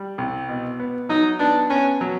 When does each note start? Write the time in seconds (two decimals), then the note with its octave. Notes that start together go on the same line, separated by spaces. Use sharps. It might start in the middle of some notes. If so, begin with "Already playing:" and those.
Already playing: G3
0.18 C2
0.49 B2
0.80 B3
1.09 F#3 D#4
1.39 B3 D4
1.70 B3 C#4
2.01 F#3